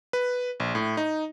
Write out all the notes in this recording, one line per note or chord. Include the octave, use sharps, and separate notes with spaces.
B4
A#1
A2
D#4